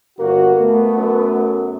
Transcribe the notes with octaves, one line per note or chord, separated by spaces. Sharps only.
G1 A#3 F#4
A3 B3
F#2